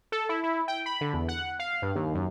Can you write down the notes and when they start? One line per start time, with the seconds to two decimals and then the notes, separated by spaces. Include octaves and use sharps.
0.12 A4
0.29 E4
0.43 E4
0.68 G5
0.86 B5
1.01 D3
1.14 E2
1.28 F#5
1.59 F5
1.82 G2
1.96 D#2
2.14 F#2